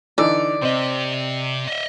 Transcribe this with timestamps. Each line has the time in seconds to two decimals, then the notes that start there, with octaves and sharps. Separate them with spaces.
0.18 D3 E3 D#4 D5
0.62 C3 C4 G4 D#5
1.67 D#5 E5